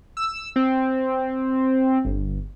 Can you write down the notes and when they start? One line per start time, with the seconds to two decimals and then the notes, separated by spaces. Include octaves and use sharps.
0.17 E6
0.56 C4
2.05 G1